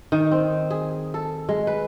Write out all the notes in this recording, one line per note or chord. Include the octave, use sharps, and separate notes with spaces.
D#3
C4
G#4
A4
G#3
B4